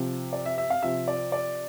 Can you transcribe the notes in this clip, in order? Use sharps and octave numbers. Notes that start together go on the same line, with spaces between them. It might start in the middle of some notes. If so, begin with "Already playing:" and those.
Already playing: C3 F3
D5
E5
E5
F5
C3 F3 E5
D5
D5